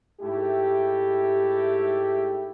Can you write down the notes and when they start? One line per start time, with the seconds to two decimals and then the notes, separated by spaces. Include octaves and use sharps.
0.21 G#2 A3 E4 G4